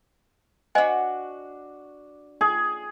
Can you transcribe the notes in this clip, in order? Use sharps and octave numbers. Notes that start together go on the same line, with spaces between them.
D4 F#4 C5 D#5 G#5
G#4